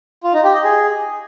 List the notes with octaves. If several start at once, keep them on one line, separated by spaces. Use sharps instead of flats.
F4
D#4
G4
D#5
G#4